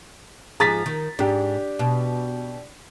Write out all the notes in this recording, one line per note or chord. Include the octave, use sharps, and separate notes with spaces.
G#2 F3 G#4 A#5 A6 B6
D#3
G#2 D4 G4
B2